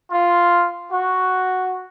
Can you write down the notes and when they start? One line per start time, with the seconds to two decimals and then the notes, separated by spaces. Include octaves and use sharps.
0.11 F4
0.92 F#4